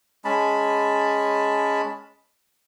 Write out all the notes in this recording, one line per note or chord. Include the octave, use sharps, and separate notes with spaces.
G#3 C#4 A5 B5